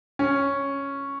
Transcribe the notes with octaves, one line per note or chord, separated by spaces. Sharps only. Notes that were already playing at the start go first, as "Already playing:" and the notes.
C#4